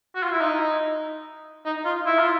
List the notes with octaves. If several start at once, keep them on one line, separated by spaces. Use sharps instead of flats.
F#4
F4
E4
D#4
D#4
F4
E4
F4